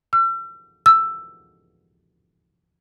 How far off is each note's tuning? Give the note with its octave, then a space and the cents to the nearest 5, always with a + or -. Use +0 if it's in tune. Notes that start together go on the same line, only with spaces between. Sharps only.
E6 +40
E6 +10